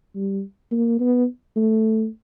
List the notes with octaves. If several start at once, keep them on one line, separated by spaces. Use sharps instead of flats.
G3
A#3
B3
A3